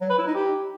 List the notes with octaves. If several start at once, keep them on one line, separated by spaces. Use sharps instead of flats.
F#3
B4
E4
D#4
G4